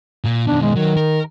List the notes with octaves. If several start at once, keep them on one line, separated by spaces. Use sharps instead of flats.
A#2
B2 D#3 D4
G#3
D#3 F#3
A#4